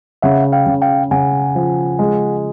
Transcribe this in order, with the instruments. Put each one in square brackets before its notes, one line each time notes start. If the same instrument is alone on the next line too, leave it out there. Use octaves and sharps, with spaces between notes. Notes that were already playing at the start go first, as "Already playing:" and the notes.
[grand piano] C#3 [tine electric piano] E5 F#5
[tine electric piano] F5 G5
[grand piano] C#3
[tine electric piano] F5 G5
[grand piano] C#3 [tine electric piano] F#5 G#5
[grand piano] F3
G#3